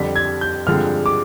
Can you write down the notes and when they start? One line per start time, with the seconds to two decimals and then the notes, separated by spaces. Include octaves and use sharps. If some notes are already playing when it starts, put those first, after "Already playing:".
Already playing: F2 D3 G3 B6
0.16 G#6
0.41 G6
0.67 G2 D3 F3 G#3 C4 F6
1.06 D6